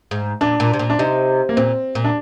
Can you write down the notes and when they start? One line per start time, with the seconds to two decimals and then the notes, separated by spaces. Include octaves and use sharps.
0.11 G#2
0.41 A#2 D4
0.60 A#2
0.73 C3
0.79 A#2
0.90 D4
0.99 C3 D#4
1.49 A#3
1.57 A#2 C4
1.95 A#2
2.04 D4